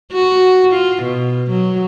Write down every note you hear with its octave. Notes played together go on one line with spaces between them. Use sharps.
F#4
F4
B2
F#3